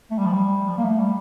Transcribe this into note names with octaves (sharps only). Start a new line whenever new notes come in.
A3
G3
F3
G3
F3
A#3
A3
G3